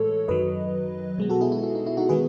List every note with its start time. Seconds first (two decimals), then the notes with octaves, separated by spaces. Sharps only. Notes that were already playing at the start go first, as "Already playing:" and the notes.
Already playing: A2 E3 G#3 A4 C#5
0.28 F#2 D#3 F#3 B4 D#5
1.18 B2 G#3 B3
1.30 F#4 A4
1.41 E4 G#4
1.52 E4
1.64 E4
1.75 D#4
1.86 E4
1.97 D#4 F#4
2.09 D#3 G#3 B3 G#4 B4